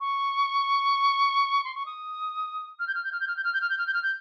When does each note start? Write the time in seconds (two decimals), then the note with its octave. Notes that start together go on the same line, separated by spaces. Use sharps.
0.01 C#6
1.64 C6
1.75 C#6
1.86 D#6
2.79 F6
2.87 G6
2.95 F6
3.04 G6
3.12 F6
3.20 G6
3.28 F6
3.36 G6
3.44 F6
3.54 G6
3.61 F6
3.70 G6
3.78 F6
3.87 G6
3.94 F6
4.03 G6